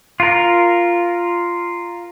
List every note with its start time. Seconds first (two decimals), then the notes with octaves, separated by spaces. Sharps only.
0.20 F4 A#4